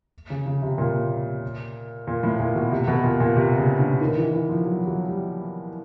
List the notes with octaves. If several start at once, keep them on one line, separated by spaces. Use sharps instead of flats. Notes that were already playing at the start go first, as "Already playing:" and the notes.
C#3
C#3
C3
A#2
A#2
A2
A#2
B2
C3
B2
A#2
A#2
C3
C#3
D3
D#3
E3
E3
F3
F#3
F#3
G3